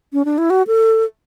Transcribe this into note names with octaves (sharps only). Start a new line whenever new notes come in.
C#4
D4
E4
F#4
A4